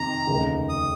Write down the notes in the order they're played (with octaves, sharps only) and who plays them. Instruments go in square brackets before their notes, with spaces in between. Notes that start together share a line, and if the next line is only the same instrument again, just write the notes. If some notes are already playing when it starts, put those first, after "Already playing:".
Already playing: [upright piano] F2 C3 D#3 [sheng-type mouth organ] A#5
[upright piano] F1 D#2 C#3
[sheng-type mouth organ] D#6